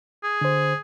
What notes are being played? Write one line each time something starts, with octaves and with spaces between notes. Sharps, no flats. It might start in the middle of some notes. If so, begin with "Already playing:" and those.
G#4
D3 C5